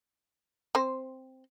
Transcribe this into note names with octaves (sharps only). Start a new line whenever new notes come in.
C4 C5